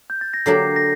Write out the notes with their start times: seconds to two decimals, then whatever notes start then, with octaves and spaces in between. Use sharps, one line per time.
0.10 G6
0.21 A6
0.34 A#6
0.46 D3 F#3 A#3 D4 G4 C7
0.76 A#6